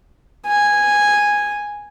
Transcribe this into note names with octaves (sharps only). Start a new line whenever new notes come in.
G#5